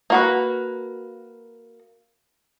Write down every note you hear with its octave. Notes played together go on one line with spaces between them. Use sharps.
A#3 F#4 B4